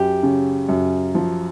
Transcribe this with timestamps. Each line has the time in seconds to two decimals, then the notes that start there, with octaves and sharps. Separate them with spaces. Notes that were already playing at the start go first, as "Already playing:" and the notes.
Already playing: F#2 G4
0.23 C#3
0.69 F#2
1.15 F3